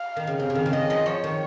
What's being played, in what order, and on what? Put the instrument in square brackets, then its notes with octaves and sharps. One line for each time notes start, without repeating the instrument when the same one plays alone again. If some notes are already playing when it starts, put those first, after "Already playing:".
Already playing: [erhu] F5
[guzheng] D#3
C#3
[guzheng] C3 [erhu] F5
[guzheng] C#3
D#3
C#3
[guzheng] D#3 [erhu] D#5
[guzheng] F3
[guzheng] F3 [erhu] C#5
[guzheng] D#3